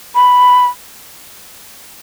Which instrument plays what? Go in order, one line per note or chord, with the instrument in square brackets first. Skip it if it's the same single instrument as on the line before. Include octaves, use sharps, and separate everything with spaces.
[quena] B5